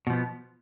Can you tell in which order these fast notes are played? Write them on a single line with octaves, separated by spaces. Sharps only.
B2 F3 B3